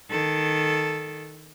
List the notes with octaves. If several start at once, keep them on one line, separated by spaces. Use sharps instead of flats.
D#3 A4